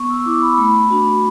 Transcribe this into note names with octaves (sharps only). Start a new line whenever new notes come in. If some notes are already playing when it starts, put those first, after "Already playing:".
Already playing: B3 C#6
E6
E6
E4 D6
B5
A3 B5
D4 F#4